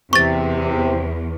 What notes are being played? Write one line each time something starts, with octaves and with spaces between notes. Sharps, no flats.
E2 C3 C#6 A6